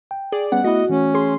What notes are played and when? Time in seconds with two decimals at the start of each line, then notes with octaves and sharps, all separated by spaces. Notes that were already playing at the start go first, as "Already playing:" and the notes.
0.11 G5
0.32 G#4 D5
0.52 G3 B3 C#4 F#5
0.64 A3 B3 E4 F#4 D#5
0.89 E3 A3 C#4
1.14 G#4 C6